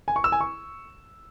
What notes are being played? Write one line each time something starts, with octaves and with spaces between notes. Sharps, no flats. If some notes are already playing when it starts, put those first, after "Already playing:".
G#5
C#6
E6
G#5
C#6